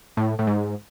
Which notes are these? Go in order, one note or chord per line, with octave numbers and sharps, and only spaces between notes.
A2
A2
G#2